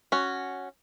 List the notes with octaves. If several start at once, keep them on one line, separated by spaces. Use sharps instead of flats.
C#4 F#4